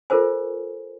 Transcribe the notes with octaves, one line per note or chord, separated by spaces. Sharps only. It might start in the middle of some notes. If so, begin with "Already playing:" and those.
F4 A4 A#4 C5 G#5